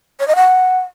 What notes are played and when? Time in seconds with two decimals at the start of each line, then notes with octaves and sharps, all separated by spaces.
0.20 C#5
0.28 D#5
0.36 F#5